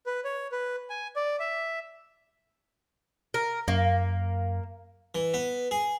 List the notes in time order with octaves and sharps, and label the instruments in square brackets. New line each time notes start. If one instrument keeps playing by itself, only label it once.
[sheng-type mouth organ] B4
C#5
B4
G#5
D5
E5
[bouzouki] A#4
[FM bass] F#2 [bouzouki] A#3
[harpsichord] E3
B3
G#4